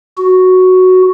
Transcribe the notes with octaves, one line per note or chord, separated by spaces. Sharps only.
F#4